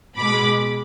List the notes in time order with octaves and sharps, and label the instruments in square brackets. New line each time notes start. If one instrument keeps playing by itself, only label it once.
[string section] B2 G#3 B5 D6